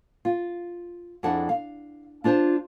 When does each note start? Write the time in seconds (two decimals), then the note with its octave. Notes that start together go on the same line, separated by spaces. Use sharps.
0.25 F4
1.23 F2 D4 E4 G#4 F#5 A5
1.49 F5
2.24 D4 F4 C5 A5